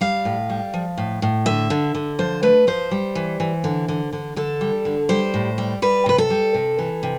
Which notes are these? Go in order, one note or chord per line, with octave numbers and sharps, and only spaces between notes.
G3 F5
A2
G3
F3
A2
A2
D3 E5
D3
D3
F3 C5
A3 B4
F3 C5
G3
E3
E3
D3
D3
D3
D3 A4
G3
D3
G3 C5
A2
G3
G3 B4
C3 B4
A4
G3
C3
E3
C3